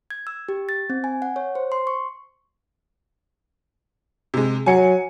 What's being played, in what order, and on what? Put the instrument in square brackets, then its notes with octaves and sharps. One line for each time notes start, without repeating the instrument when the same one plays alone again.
[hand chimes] G#6
E6
G4
A6
C4
G#5
F#5
C#5
C5
C6
C#6
[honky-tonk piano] C3 G#3
[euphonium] F#3 [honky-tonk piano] G#5 C#7